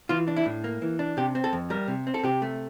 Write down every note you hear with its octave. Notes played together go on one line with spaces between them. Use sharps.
E3 F4
D4
E4
A2
A#3
E3
D4
C3 G4
C4
A4
F2
G3 A#4
C3
C4
A4
C3 G4
A3